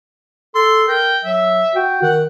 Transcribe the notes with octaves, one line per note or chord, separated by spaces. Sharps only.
A4 C6
A#4 G5
F#3 E5
F#4 G5
D#3 F#5